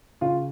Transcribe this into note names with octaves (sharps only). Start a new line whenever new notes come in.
C#3 F4